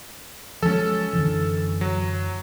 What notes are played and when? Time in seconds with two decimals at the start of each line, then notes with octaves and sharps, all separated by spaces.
0.63 F3 F#3 G#3 C#4 A4
1.13 F#2 D3 E3
1.81 F#3